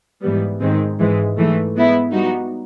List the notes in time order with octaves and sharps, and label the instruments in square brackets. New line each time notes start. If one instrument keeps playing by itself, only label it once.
[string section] G#2 E3 G3 B3
G#2 D#3 G#3 C4
G#2 E3 G#3
G#2 E3 A3
G#3 B3 E4
G3 B3 D#4 F#4